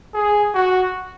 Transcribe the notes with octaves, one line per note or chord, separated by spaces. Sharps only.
G#4
F#4